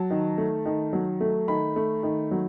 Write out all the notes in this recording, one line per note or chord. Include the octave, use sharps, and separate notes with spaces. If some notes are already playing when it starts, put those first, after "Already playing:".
Already playing: F#3 A5
D#3
A3
D#3
F#3
A3
D#3 B5
A3
D#3
F#3